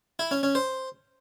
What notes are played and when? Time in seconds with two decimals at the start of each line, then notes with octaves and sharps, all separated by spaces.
0.19 E4
0.31 C#4
0.43 C#4
0.55 C5